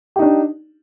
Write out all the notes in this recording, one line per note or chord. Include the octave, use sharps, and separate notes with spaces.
D4 D#4 G4